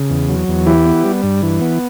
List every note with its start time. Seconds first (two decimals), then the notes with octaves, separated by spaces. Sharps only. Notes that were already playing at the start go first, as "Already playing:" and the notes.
Already playing: C#3
0.10 E2
0.29 F#3
0.48 E2
0.67 E3 E4 G4
0.85 B3
1.05 G3
1.23 G2
1.42 E3
1.61 B3